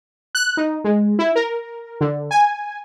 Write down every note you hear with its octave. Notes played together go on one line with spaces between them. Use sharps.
F#6
D#4
G#3
E4
A#4
D3
G#5